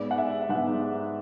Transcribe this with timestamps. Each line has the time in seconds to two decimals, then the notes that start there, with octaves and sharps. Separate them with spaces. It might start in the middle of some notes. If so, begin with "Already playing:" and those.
Already playing: G#2 G#3 B3 D5
0.11 F#5
0.18 E5
0.49 G#2 G#3 B3 F#5